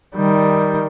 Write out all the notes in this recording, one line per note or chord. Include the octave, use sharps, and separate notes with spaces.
D#3 G3